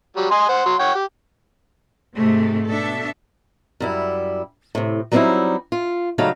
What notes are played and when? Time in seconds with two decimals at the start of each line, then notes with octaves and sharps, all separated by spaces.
0.17 F#3 G3
0.31 D#5 G#5 C6
0.49 C5 F#5
0.66 F#3 C6
0.79 C#5 F#5 G5
0.95 G4
2.16 G#2 C3 G#3 A3
2.66 B2 D4 A4 E5
3.80 F#2 G3 E4
4.75 A2 C3
5.12 F#3 G3 C4 C#4 D#4 E4
5.72 F4
6.18 C#3 F#3 G3 A3 D#4 F5